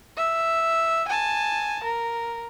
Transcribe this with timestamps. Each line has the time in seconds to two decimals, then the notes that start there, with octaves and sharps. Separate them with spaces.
0.17 E5
1.08 G#5 A5
1.83 A#4